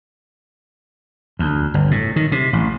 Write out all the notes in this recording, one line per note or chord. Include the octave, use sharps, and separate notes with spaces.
D2
G1
A2
D#3
C3
A1